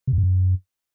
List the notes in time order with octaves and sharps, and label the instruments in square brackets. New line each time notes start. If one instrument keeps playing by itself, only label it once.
[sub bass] C3
F2
G2
F#2